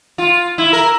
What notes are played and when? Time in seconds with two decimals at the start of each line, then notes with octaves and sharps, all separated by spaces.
0.18 F4
0.58 E4
0.73 A#4